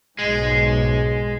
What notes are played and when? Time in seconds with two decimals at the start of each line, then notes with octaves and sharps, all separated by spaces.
0.19 B1 G#2 G#3